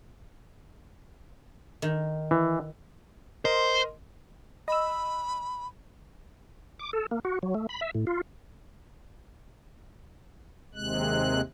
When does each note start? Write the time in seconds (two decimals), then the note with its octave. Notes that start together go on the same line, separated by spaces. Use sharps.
1.82 D#3
2.31 E3
3.45 A#4 C5 D#5 C6
4.68 D#5 B5 E6
6.79 D6
6.93 A4
7.11 A#3
7.25 F#4
7.43 F#3
7.54 A3
7.69 B5
7.81 E5
7.95 A2
8.07 F4
10.75 D#2 C3 G#3 F#6